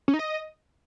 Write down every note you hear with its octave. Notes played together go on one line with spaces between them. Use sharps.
C#4
D#4
D#5